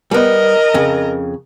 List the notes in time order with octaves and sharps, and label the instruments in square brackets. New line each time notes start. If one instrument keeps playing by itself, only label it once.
[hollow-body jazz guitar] G3 B3 [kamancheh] A#4 D#5
[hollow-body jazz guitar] F2 C#3